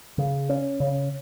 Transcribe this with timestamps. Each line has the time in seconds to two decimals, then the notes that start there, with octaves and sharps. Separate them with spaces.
0.18 C#3
0.49 C#4
0.80 C#3